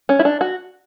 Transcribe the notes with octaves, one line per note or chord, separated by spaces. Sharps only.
C#4
E4
D4
F#4